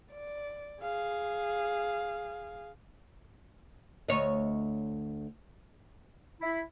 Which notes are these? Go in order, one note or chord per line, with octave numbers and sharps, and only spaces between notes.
D5
G#4 F5
D2 C#5 D#5
E4